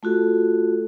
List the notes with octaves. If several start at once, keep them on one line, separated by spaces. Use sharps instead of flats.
A3 F4 F#4 A4